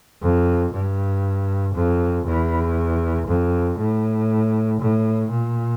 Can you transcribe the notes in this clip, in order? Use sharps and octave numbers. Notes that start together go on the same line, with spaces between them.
F2
G2
F2
E2
F2
A2
A2
A#2